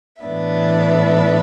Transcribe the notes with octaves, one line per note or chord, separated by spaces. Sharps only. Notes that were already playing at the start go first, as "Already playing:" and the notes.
A2 E3 B3 D4 E5